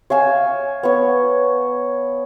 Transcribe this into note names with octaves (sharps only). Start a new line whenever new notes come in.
C#5 F5 G#5 E6
B3 C#5